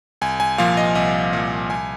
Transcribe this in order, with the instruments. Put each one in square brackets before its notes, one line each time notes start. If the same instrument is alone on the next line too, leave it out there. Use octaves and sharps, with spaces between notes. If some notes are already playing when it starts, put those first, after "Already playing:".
[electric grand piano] C2 G#5
G#5
A#2 F3 F5
D#5
C2 D#5
A#2 F3 F5
C2 G#5